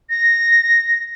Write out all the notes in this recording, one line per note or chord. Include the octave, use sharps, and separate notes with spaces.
A#6